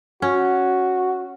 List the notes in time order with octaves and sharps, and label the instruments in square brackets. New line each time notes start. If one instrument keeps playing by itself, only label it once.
[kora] C#4 [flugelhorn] F#4